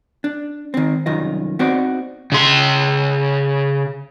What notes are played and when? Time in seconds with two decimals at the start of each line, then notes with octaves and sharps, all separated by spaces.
0.24 D4
0.74 D#3 C4
1.06 C2 F#2 D#3 F4 D#5
1.59 B3 C4 D#4 F#4 C5 D5
2.32 C#3 C6